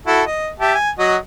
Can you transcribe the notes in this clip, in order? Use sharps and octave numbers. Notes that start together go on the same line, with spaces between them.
E4 F#4 A4
D#5
G4 E5 A5
G#5
F#3 F#4 D#5